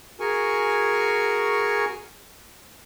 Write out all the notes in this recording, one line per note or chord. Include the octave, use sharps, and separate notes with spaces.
F#4 G#4 A#4 G#5 C#6